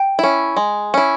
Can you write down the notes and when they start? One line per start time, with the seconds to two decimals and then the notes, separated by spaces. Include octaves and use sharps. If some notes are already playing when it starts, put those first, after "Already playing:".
Already playing: G5
0.19 C#4 E4
0.57 G#3
0.94 C#4 E4